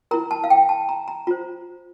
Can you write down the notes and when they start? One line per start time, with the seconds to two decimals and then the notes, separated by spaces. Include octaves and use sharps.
0.11 E4 A#4 A#5
0.31 A5
0.44 F5
0.50 G5
0.69 A5
0.89 A#5
1.08 A#5
1.27 F4 C5 A#5